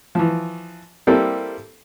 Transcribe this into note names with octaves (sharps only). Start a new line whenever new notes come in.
E3 F3
G3 A#3 C4 E4 G4 A4